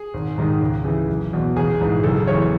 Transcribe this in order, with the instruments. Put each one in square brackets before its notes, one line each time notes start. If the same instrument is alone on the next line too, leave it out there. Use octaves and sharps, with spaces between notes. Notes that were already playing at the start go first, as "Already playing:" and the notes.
Already playing: [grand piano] G#4
G#1
G#2 D#3
C#2
C#3 E3
F#1
E2 B2
A1 G#4
G#2 E3
F#1 A4
E2 C#3 E3 C#5